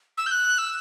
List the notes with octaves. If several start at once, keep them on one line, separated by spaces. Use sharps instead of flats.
E6
G6
F#6
E6